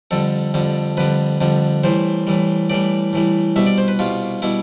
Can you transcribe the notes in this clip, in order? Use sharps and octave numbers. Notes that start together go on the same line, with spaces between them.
F2 D3 G3 A4
F2 D3 G3
F2 D3 G3 B4
F2 D3 G3
A2 E3 G3 C5
A2 E3 G3
A2 E3 G3 D5
A2 E3 G3
C2 B2 G3 E5
D5
C5
B4
C2 B2 G3 F4
B2 G3 E4